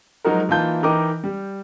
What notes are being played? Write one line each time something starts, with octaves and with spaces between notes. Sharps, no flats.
F3 F#3 G#3 D#4 F#4 A#4
E3 A#3 D#4 F4 A5 G6
E3 D#4 A#4 D#5 G5 D6
G3